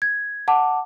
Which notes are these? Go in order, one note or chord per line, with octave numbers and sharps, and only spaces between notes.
G#6
F#5 A5 D6